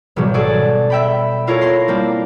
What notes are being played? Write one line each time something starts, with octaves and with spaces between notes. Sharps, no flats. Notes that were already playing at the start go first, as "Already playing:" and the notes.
G#1 B2 F#3 G3
F#4 G#4 A4 D5
E5 G5 B5
E4 F4 A4 A#4 C#5
C6 A#6 C7
G3 A#3 C4 D4